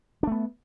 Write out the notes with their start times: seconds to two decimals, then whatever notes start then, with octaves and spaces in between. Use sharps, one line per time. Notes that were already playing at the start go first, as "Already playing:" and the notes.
0.23 D4
0.27 A3
0.32 B3